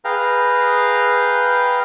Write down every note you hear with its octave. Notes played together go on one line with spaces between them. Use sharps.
G#4 B4 F5 G5 A#5